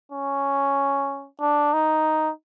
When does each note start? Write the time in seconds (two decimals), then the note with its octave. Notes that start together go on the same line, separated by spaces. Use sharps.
0.12 C#4
1.41 D4
1.73 D#4